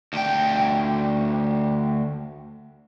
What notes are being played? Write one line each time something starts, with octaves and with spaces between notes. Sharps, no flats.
D2 G5